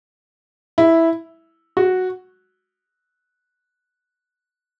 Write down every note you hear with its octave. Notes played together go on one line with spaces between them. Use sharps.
E4
F#4